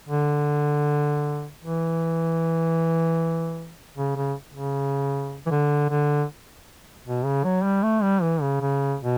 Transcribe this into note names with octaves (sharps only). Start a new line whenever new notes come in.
D3
E3
C#3
C#3
C#3
E3
D3
D3
B2
C#3
F#3
G3
A3
G3
E3
C#3
C#3
B2